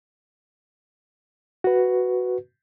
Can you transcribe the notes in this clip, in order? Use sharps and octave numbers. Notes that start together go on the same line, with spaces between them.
F#4 B4